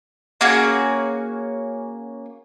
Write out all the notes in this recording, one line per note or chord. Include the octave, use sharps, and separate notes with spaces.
A#3 C#4 F#4 G#4